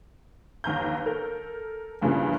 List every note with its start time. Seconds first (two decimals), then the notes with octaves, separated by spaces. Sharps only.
0.64 G1 D#2 A#5 G6
1.06 A4 A#4
2.01 E2 G2 C#3 E3 F3 A#3